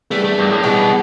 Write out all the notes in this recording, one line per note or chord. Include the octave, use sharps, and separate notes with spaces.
E2 E3 G3 A3 D4
A3
G2
A2
E2 B2 E3 G3 D4